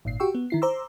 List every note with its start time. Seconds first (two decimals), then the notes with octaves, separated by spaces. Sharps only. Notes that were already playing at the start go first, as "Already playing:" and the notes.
0.05 G#1 A#2 C7
0.20 F#4 G4 G5 C#6 E6
0.35 B3
0.50 D#3 E4 C7
0.62 C5 A#5 C6 D6 E6